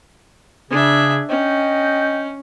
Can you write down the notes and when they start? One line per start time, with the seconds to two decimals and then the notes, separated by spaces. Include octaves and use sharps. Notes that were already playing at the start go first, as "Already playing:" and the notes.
0.70 C#3 D4 G#4 E5
1.29 C#4 D#5 G5